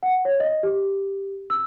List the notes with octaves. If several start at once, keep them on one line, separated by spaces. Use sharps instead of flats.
F#5
C#5
D#5
G4
E6